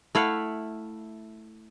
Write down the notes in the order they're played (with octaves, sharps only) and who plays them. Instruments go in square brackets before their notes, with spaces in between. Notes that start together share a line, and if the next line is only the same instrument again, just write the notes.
[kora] A3 E4 F5 F#5